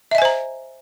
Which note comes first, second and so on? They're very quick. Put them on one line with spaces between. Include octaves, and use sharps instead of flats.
E5 D#5 G#5 C5 A#5